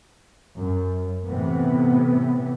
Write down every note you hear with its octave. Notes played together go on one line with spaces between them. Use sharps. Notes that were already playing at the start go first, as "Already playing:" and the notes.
F#2
A2 C3 E3 B3